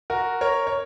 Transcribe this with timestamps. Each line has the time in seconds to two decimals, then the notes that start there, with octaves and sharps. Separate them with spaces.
0.10 F#4 A#4
0.41 A#4 C#5
0.67 C#5